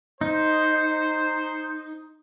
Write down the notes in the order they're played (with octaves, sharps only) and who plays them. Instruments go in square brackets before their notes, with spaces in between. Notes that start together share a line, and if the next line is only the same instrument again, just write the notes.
[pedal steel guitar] D#4 [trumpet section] C5